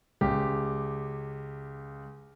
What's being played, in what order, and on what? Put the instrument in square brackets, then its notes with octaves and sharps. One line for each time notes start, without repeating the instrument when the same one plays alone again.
[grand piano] C#2 G4